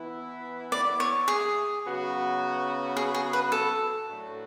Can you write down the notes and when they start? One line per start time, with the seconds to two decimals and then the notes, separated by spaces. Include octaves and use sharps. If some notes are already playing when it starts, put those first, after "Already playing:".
Already playing: E3 B3 E4
0.72 D5
1.00 C#5
1.28 G#4
1.84 C#3 F#3 B3 F#4
2.97 G#4
3.14 G#4
3.33 B4
3.52 A4
4.08 A2 F#3 A3 D4 F#4